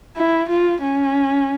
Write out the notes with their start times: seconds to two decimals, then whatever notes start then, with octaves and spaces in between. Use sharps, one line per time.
0.16 E4
0.49 F4
0.82 C#4